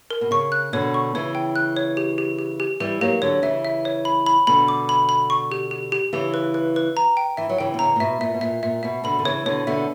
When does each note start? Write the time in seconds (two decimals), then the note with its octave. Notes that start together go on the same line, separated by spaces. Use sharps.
0.10 A#4
0.21 B2
0.31 C#3 C#6
0.52 F#6
0.73 B2 D3 C#5
0.94 C#6
1.15 C#3 E3 C#5
1.35 G5
1.56 F#6
1.77 C#5
1.97 G4
2.18 G4
2.39 G4
2.60 G4
2.80 E3 G3 G4
3.01 F#3 A#3 G4
3.22 D3 F#3 C#5
3.42 C#3 E3 E5
3.65 E5
3.85 C#5
4.05 B5
4.26 B5
4.47 B2 D3 B5
4.68 D6
4.89 B5
5.09 B5
5.30 C#6
5.52 G4
5.71 G4
5.92 G4
6.13 C#3 E3 G4
6.34 B4
6.54 B4
6.76 B4
6.97 A#5
7.17 G5
7.37 E3 E5
7.49 F#3
7.58 C#3 E3 G5
7.74 B2
7.79 C#3 A#5
7.96 A#2
8.00 B2 E5
8.21 A#2 E5
8.34 B2
8.41 A#2 E5
8.63 A#2 E5
8.83 B2 E5
9.04 B2 D3 B5
9.19 D3
9.25 C#3 E3 C#5
9.46 B2 D3 C#5
9.67 B2 D3 E5